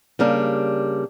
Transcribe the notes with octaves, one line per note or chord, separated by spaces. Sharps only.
C#3 G3 A#3 D4